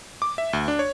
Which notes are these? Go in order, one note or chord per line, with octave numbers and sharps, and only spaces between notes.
D6
E5
D2
D4
C#5